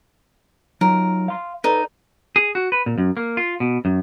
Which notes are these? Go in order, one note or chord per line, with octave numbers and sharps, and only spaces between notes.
F#3 D#4 F4 A#4
F5 C6
D#4 A4 B4 D5
G#4
F#4
B4
A#2
F#2
A#3
F4
B2
F#2